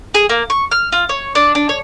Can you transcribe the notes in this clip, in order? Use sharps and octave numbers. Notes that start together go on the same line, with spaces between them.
G#4
A#3
C#6
F6
F4
C#5
D4
D4
C#5